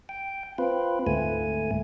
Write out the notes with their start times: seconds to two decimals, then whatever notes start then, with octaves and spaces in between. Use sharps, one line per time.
0.09 G5
0.58 C4 F4 B4
1.07 D2 G#2 A3 G#5